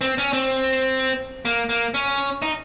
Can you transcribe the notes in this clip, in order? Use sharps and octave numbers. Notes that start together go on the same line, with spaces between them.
C4
C#4
C4
A#3
A#3
C#4
D#4